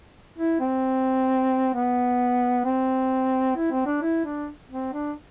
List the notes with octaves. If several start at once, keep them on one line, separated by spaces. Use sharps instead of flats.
E4
C4
B3
C4
E4
C4
D4
E4
D4
C4
D4